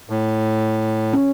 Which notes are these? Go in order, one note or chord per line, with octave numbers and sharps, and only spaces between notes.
A2
C#4